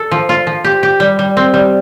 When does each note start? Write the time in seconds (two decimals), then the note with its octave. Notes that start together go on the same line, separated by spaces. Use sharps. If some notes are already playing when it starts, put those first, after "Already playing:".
Already playing: A4
0.11 F3
0.29 F4
0.47 F3
0.65 G4
0.83 G4
1.00 G3
1.19 G3
1.37 C4
1.54 G3